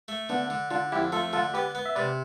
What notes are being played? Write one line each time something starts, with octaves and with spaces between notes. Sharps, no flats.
A3
D3 B3 D4
D3
D3 D4 F4
F2 E4 G4
A3 F4 A4
D3 F4 A4
B3 G4 B4
B3
E5
C3 B4 D5